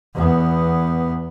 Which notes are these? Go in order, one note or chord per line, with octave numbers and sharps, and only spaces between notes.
E2 B3